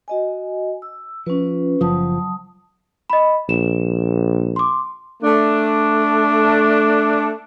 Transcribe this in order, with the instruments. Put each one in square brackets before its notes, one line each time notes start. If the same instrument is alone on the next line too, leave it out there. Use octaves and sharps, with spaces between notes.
[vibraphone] F#4 D#5 G#5
E6
[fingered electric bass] F3 [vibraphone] C#4 F4 B4
[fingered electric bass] F#1 F3 [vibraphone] F#3 A5 D#6
[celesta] D#5 B5
[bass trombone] A#1 [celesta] E7
[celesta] C6 D6
[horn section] A3 D4